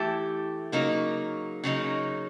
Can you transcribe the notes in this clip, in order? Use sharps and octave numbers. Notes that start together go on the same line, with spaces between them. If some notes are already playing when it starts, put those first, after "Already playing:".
Already playing: E3 A3 E4 G4
C#3 F#3 A#3 D#4
C#3 F#3 A#3 D#4